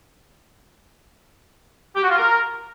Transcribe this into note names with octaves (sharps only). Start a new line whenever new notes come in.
G4
F#4
F4
A#4